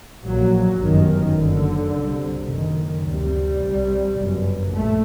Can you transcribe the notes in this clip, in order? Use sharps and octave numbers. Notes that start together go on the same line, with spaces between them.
A#1 A#2 F#3
G1 F#2 D#3
F#1 F#2 D3
C2 C3
F#1 F#2 D#3
D2 C3 G3
C2 C3
G1 F#2
A#1 A3